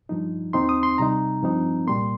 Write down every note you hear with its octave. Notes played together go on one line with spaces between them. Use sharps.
G2 F3 D#4
D#2 D#3 C4 D#4 C6
D#6
C6
C3 G3 D#4 A#5
G2 F3 C4 D#4
C2 A#2 G3 A#3 C6